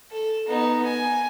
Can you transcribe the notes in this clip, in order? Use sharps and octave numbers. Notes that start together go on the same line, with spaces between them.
A4
B3 D#4
G#5